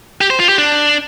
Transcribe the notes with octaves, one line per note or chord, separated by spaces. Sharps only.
G4
C5
F4
G4
D4